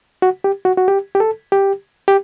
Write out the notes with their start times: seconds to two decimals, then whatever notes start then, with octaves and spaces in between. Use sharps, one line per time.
0.22 F#4
0.44 G4
0.65 F#4
0.77 F#4
0.88 G4
1.15 G4
1.20 A4
1.52 G4
2.08 G4